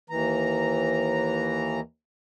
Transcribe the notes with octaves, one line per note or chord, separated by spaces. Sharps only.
D#2 E3 A#5